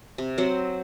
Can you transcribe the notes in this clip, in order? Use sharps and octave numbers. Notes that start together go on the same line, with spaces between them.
C3
F#3 C4 C5 F#5